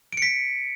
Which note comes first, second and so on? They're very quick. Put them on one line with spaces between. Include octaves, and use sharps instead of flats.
D7 C#7 B6